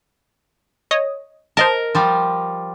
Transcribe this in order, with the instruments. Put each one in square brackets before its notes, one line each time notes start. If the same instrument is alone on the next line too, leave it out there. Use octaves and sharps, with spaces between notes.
[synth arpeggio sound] C#5 D#5 D#6
[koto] A#4 [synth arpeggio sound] C5 D#5 A5
[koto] F3 G3